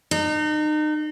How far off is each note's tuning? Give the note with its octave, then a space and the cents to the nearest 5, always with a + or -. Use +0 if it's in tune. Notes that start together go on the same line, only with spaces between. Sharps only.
D#4 -35